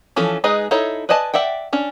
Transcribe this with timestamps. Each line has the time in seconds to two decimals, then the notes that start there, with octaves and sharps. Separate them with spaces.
0.16 E3 F3 C#4 A4
0.44 G#3 D#4 G#4 B4 D#5
0.71 D#4 E4 A4 C#5
1.09 B4 D5 D#5 G#5 A5
1.34 D5 E5 F#5 G5
1.73 C#4 D4